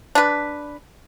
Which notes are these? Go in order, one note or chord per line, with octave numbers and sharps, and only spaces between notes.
D4 B4